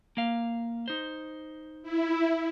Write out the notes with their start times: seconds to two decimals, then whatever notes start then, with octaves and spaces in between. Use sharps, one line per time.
0.17 A#3 F5
0.88 D#4 C5
1.83 E4